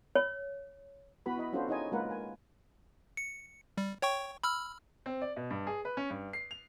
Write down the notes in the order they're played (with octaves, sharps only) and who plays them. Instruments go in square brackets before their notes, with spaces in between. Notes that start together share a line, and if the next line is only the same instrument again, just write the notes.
[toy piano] C#5
[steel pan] B3 E4 F#4 B4 B5
E4 D#5 B5
C#4 D4 F4 F#4 A4 C5
D#4 E4 G#4 C#5 D#5 G#5
G#3 A#3 F4 A#4 B4 F#5
G#5
[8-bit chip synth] C#7
G3
C#5 G5 C#6
B5 E6 F6
[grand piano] C4
D5
B2
G2
G#4
B4
C#4
G2
C7
F7